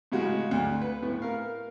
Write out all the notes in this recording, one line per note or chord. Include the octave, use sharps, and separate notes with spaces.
A2 C#3 G#3 F#4
D2
B4
A2 B3
A#4 F5